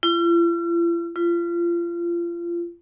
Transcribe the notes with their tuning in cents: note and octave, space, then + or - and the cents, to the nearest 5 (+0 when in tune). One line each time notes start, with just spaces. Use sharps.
F4 -45
F4 -30